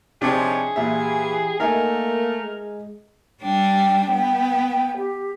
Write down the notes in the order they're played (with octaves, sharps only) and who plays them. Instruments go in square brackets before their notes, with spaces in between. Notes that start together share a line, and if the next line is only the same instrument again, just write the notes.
[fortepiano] C3 D4 G4 [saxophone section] F3 D#4 C#5 [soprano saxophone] G#4
[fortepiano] A#2 E5 [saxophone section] E3 [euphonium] G4
[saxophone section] A3 [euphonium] A#3 [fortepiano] D#4 E5 G#5 [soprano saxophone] A#4
[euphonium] G#3
[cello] G3 D4 [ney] G5
[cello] B3
[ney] G4